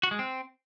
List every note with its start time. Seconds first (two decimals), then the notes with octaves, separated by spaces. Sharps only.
0.03 F#4
0.11 G#3
0.19 C4